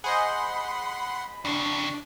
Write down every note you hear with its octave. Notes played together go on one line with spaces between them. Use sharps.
G#4 C5 D#5 F#5 B5 C6
F2 C#3 D4